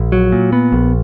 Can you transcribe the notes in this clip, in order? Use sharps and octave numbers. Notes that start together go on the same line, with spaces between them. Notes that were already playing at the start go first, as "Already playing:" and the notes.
Already playing: A#1
F#3
A#2
B3
A#1